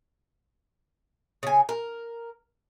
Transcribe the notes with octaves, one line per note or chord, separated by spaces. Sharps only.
C#3 G#5
A#4